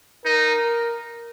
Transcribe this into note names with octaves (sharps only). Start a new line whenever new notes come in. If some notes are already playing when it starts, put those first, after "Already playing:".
D#4 A#4